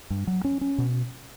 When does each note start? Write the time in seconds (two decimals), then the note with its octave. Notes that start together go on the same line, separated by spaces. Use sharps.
0.10 G2
0.27 F#3
0.44 C#4
0.61 C#4
0.78 B2